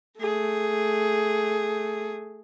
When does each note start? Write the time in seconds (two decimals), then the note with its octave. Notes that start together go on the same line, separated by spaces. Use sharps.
0.19 A3 G#4